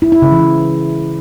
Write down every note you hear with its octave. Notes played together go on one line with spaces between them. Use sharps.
E4
E4
C#3
E3